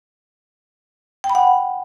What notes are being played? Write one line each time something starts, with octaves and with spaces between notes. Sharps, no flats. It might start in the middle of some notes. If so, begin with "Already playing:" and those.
G5
B5
F#5